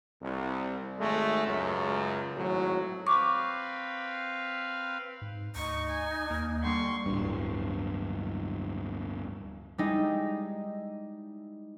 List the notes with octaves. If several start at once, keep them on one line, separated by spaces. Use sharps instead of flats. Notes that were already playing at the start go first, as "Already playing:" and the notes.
C2
G#1 G#3 A3
C#2 F#2
G#1 A2 F#3
C4 B4 F5 C#6 D6
G#2
D2 D#4 C#6
G#5
D#2 A#3
D3 G3 A#3 C6 C#6
D1 G2
G3 G#3 D#4 E4